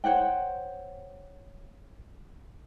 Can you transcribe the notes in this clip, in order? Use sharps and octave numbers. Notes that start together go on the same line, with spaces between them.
C5 C#5 F#5 G5